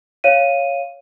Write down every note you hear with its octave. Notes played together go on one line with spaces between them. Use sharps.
C#5 F5 D#7